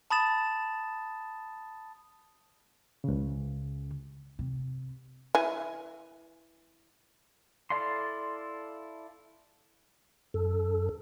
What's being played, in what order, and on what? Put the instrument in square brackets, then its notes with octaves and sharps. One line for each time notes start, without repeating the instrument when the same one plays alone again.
[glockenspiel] A5 B5 D#6 A6 E7
[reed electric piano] C#2 C#3
[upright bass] C3
[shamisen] E3 G#5
[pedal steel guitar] E4 A4 D5 F5 C6
[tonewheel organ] F#2 A4